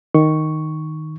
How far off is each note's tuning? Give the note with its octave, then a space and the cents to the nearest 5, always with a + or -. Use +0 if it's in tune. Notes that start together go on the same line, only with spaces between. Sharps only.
D#3 +0 C#6 +0